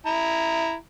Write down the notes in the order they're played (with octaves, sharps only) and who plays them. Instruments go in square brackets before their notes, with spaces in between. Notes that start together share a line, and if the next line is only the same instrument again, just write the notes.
[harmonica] E4 A#5